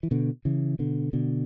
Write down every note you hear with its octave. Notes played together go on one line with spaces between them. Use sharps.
E3
B2 D3
C#3 E3
B2 D3
B2 D3